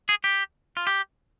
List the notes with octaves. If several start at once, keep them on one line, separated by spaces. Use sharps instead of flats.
G#4
G4
F4
G4